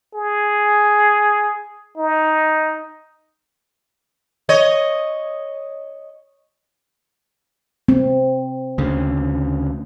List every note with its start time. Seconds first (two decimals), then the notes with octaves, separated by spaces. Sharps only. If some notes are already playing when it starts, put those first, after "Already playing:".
0.14 G#4
1.97 D#4
4.49 C#5 D#5
7.89 C4
8.78 D2 C#3